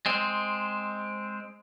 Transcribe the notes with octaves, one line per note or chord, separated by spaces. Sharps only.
G#3 C4